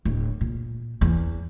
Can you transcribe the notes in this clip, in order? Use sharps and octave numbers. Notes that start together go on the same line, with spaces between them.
D1
A#2
E2